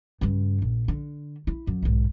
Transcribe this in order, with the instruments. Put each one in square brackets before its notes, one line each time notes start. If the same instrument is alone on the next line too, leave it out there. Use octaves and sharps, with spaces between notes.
[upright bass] G2 C#3
A#1
D3
E4
F#2
B1 G#2